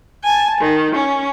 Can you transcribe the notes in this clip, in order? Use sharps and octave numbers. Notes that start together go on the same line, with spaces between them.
G#5 A5
D#3
C#4